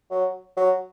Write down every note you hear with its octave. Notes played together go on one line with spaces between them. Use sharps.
F#3
F#3